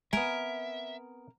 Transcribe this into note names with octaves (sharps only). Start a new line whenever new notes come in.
B3 C4 A#4 E5 G#5